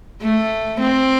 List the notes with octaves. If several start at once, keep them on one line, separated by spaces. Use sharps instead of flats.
A3
C4